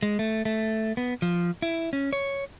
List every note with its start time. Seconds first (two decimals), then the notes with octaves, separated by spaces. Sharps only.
0.03 G#3
0.19 A3
0.45 A3
0.97 B3
1.22 F3
1.62 E4
1.93 C#4
2.13 C#5